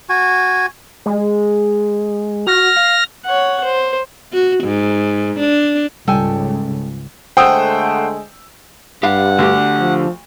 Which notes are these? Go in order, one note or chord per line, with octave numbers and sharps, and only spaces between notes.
F#4 G#5
G#3
F#4 F6 A#6
F5
C#5 F#5
C5
F#4
G#2
D4
C#2 G#2 C#3 G3 A4 G5 G#5
D3 G#3 A3 C5 F#5 G5 D#6 E6
G2 G4 F5 F#5
D2 D3 G4
F3